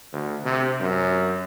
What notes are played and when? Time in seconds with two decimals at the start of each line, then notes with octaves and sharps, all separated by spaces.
0.13 D2
0.44 C3
0.80 F#2